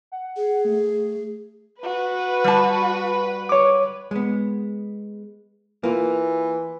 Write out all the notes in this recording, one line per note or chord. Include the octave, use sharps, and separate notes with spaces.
F#5
G#4
A3
F#4 B4
G3 A5
C#5 D6
G#3 B3
E3 A#3 F4